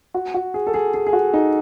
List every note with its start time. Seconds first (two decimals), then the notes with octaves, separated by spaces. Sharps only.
0.14 F#4
0.34 F#4
0.54 G#4
0.67 A4
0.74 G#4
0.94 G#4
1.07 G#4
1.13 F#4
1.34 D#4